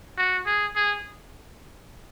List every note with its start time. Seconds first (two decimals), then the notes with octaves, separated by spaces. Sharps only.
0.17 F#4
0.46 G#4
0.75 G#4